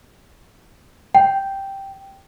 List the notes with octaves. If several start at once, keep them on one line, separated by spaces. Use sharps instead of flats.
G5